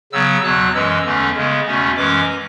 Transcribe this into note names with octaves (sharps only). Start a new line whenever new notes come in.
C#3 F#3 B3 E6
E2 B2 F#3 F#6
F#2 E3 G#3 E6
E2 D3 A3 C#4
C#3 G#3 B3
E2 B2 A3 C#4
F#2 E3 G#3 C#4 D6